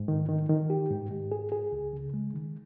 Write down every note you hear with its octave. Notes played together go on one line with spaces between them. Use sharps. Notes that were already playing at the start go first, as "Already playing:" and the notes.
Already playing: G#2
D#3
D#3
D#3
G4
G#2
G#2
G#4
G#4
C#2
C#3
G#3
D#3